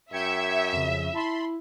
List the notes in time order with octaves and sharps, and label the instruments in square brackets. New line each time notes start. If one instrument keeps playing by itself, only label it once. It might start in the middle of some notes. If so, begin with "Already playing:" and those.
[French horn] F#2 [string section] E5 [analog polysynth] G5 G#6 C#7
[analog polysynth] F2 C#3
[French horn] E4 [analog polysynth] A5 B5 C6